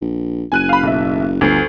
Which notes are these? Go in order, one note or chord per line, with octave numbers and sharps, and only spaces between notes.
A#1
F#1 G#5 F#6 D#7
F5 B5
B1 E5
G1 D2 C7